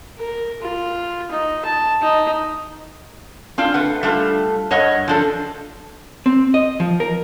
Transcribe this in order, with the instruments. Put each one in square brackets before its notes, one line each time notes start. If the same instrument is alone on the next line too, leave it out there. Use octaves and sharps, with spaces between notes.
[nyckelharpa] A#4
F4
D#4
A5
D#4
[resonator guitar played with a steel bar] C4 D4 F4
A3 B4 F#5
G3 A3 D4 F4
G2 C#5 D#5 F#5
F3 D4 A4
[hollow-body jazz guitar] C4
D#5
F3
A#4